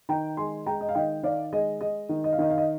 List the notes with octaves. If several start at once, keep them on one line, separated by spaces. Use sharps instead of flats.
D#3 G5 A#5
G#3 G#5 C6
G#3 G5 A#5
D#5
F5
D#3 D#5 G5
D#3 D5 F5
G#3 D#5
G#3 D#5
D#3
D#5
F5
D#3 D#5
F5
D#5